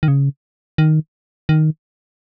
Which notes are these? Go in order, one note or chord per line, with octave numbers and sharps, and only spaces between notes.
D#3
C#3
D#3
D#3